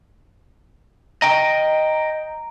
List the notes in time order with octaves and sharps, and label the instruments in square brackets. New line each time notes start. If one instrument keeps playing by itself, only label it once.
[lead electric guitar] D#5 G5 [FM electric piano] A#5